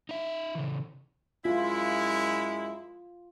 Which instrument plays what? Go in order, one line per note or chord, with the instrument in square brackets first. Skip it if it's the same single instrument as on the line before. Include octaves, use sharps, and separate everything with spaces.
[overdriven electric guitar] D#4 E5
C#3 E3
[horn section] F#2 G#3 E4 [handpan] F4